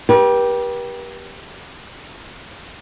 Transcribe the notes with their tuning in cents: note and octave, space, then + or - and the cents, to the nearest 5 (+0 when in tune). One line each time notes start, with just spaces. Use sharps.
G4 +0 B4 -45